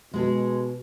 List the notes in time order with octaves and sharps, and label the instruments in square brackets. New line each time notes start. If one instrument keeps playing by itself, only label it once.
[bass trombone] B2 [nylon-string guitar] G#3 G#4 A4